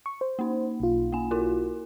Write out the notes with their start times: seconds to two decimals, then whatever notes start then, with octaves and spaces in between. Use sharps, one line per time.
0.06 C#6
0.21 C5
0.39 A#3 D#4
0.80 B1 F4
1.12 A#3 G#5
1.31 E4 F#4 A#4